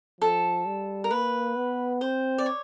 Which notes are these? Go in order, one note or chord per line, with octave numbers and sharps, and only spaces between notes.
F3 A4
G3
A#4
A#3 B4
B3
C4 C5
D5
C#5